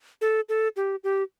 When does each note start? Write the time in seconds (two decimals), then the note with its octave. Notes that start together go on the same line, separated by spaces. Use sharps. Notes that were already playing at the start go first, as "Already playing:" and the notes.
0.21 A4
0.49 A4
0.76 G4
1.04 G4